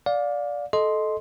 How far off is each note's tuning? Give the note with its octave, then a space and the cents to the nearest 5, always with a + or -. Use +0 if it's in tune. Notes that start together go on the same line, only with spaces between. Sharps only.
D5 -10 F5 +25
A4 -15 D#5 +0 C6 +0